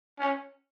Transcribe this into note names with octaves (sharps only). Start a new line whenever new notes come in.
C#4